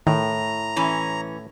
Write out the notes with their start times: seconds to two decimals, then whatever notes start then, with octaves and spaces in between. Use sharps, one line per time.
0.07 A2 D#3 A#5
0.76 E3 C#4